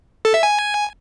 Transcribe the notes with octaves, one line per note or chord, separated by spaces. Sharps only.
A4
E5
G#5